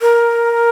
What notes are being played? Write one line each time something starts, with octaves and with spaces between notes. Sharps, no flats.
A#4